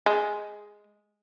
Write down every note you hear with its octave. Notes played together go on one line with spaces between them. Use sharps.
G#3